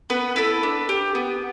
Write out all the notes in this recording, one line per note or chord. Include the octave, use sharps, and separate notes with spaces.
B3 B4
E4 A4 B4
D4
G4
B3